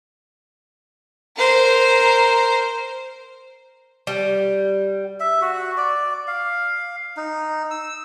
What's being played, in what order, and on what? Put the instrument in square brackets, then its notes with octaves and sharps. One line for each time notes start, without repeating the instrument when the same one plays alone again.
[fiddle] A#4 C5
[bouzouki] G3
[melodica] E5
F#4
D5
F5
D#4
E6